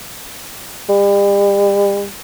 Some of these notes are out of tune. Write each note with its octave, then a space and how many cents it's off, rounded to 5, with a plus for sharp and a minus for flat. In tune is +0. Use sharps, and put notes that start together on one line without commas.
G3 +40